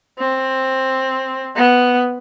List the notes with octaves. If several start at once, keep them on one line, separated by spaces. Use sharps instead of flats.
C4
B3